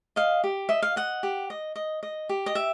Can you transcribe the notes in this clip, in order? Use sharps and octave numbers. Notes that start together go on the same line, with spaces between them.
D#5 F5
G4
D#5 E5
F5
D#5 F#5
G4
D#5
D#5
D#5
G4
D#5
G4 E5